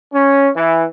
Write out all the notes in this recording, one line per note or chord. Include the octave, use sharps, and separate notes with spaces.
C#4
E3